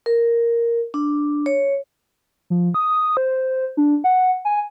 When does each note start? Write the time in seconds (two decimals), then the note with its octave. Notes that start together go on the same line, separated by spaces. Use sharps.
0.06 A#4
0.94 D4
1.46 C#5
2.50 F3
2.74 D#6
3.17 C5
3.77 D4
4.04 F#5
4.45 G#5